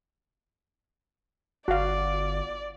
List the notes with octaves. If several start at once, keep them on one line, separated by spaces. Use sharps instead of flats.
G1 F#4 D5 F5